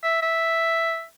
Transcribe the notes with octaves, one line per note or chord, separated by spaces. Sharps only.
E5
E5